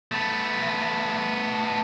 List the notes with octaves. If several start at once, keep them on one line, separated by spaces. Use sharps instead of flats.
A3 B3